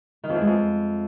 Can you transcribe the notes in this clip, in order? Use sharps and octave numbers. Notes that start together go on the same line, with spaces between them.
D#3
F2
E2
G#3
F2